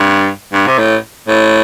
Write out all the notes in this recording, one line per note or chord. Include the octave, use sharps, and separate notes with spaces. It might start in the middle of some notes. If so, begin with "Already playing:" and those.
Already playing: G2
G2
C3
A2
A2